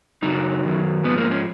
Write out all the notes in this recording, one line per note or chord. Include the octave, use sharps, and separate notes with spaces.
F#2 C#3 F#3 D#4
F#2 D#3 F#3
G#2 F3 B3
A#3
C#4